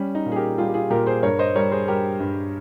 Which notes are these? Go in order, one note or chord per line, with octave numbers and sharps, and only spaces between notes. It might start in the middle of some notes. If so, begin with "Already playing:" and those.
Already playing: G3 C#4
D#4
A#2
G#4
G4 A#4
G3 F4 G#4
G4
F4 G#4
A#2 G4 A#4
G#4 C5
G2 A#4 C#5
C5 D#5
G3 A#4 C#5
G#4 C5
G3 G4 A#4
G2